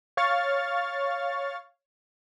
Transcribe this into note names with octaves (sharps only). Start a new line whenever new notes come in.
C#5 F5 C#6 F6 A6